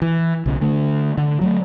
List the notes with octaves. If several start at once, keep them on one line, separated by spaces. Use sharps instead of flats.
E3
B1 C#3
D3 A3
D3
F#3 G3 A3